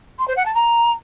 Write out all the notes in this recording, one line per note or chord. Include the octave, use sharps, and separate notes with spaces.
C6
C5
F#5
A5
A#5